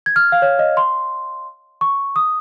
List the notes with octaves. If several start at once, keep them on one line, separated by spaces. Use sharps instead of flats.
G#6
F6
F5
C#5
D#5
C6
C#6
D#6